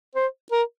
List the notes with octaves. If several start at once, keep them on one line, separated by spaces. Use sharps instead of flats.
C5
A#4